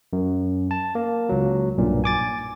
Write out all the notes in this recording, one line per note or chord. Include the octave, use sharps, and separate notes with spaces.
F#2
A5
A#3
C#2 F#3
B1 G2 A#2
G#5 D6 A6